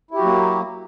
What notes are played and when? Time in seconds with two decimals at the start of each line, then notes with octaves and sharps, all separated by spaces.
0.11 E4
0.14 G4
0.18 F#4
0.22 F#3
0.25 A#3